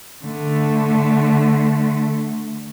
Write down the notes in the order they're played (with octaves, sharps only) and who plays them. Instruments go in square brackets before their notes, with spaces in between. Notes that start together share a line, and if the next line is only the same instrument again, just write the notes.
[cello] D3 A3